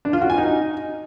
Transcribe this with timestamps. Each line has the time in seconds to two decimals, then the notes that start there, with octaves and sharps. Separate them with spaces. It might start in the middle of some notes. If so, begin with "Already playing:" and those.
0.05 D4
0.13 F4
0.21 F#4
0.30 G#5
0.38 D#4